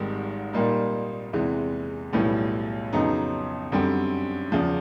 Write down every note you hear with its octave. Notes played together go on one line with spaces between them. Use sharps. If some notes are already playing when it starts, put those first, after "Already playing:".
Already playing: G#1 G#2 D#3 G3
A#2 G3 A#3 D#4
E2 C3 E3 G#3
B1 A2 E3 G3 B3
F2 C#3 F#3 B3 D#4
F#2 D3 G3 C4
E2 C#3 F3